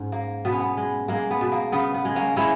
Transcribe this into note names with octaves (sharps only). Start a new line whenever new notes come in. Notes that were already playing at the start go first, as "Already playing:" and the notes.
Already playing: G#2 C#4
A#3
B2 B3
C#4
B3
G#3
G#3 A#3
B3
B2
A#3
C#3 B3
B3
G#3
A#3 C#4
G#3 C#4 E4